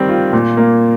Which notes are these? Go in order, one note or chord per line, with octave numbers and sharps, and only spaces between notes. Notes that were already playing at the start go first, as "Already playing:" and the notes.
Already playing: D#3 G3 C4
F4
A#2
A#3